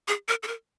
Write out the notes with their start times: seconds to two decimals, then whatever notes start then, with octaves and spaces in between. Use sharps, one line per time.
0.08 G#4
0.29 A#4
0.43 A4
0.48 A#4